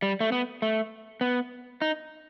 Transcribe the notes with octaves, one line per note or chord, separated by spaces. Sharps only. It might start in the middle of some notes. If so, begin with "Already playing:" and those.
G3
A3
B3
A3
B3
D#4